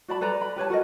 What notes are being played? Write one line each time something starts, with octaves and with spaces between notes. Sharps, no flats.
F#4 D5 A5 B5
A4 B4 D5 A#5
B5
G4 B4 C#5 A5
F#4 A4 A#4 D#5